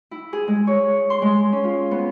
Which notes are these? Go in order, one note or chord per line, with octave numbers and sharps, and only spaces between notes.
E4
G#4
G#3
C#5
C6
G#3
C#4
F4
B3